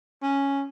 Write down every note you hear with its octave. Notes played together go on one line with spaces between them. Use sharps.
C#4